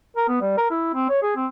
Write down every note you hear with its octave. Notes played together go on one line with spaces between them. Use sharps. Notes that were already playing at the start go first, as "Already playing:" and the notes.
A#4
B3
G3
A#4
E4
C4
C#5
G#4
C4